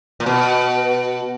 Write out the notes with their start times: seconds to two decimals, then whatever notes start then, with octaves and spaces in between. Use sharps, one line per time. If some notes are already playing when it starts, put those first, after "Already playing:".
0.20 A#2
0.26 B2